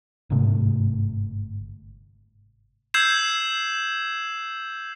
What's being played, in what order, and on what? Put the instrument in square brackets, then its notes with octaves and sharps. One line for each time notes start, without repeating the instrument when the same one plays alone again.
[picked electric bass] G1 G#2 C3 A3
[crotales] E6 G6 G#6 C7 E7